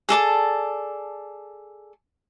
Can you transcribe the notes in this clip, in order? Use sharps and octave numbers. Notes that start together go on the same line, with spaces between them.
G#4 A4 D5 A5